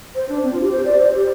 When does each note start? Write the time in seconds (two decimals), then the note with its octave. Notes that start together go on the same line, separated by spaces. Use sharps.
0.15 C5
0.29 D4
0.43 C4
0.52 F4
0.62 G4
0.72 C5
0.85 D5
1.00 C5
1.14 G4